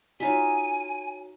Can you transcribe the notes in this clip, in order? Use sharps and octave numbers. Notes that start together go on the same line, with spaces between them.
D#4 F4 F#4 C#5 E5 G#5